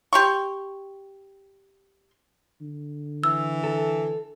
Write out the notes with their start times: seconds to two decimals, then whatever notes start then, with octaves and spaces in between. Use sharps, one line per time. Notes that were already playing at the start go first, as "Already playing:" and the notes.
0.13 G4 C6 C#6
2.61 D3
3.24 E3 E6
3.64 A4